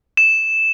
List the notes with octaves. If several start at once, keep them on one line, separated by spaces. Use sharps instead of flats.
E7